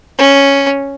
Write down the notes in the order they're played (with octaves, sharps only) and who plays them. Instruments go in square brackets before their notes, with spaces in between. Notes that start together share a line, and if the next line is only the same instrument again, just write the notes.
[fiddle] C#4